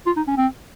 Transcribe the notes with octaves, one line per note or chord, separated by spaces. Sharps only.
F4
D#4
C#4
C4